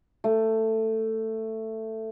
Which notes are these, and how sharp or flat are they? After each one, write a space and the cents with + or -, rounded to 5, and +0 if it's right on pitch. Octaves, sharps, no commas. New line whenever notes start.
A3 +10